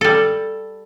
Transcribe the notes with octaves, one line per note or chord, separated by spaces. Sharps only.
G3 A4